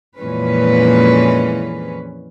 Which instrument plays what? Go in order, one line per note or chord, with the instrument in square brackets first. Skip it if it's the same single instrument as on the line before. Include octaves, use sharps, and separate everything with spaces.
[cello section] F2 A#2 E3 G#3 C#4 B4